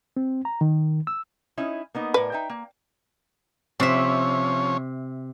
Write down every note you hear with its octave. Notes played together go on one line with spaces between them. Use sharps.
C4
A#5
D#3
E6
C#4 D#4 E4
A#3 B3 D#4
A2 A#4 B4 D5
D#4 E5 G5
A#3
C3 F3 C#4 C#5 E5